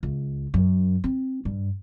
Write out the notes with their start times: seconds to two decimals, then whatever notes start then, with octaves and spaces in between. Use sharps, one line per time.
0.03 C#2
0.54 F#2
1.04 C4
1.45 G2